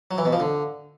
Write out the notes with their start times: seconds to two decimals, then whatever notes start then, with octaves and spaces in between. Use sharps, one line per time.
0.11 F#3
0.18 E3
0.25 B2
0.33 F3
0.40 D3